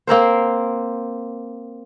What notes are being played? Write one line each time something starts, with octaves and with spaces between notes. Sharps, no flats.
A#3 C4 A#4 C5